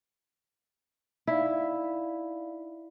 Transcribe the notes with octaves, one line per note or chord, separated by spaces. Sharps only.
D#4 E4 D5 F5